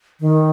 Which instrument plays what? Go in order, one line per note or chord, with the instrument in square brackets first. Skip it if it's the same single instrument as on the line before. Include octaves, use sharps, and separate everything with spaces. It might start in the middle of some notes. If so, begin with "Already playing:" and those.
[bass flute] D#3